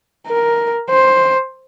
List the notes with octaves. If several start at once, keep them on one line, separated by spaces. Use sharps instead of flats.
A#4
C5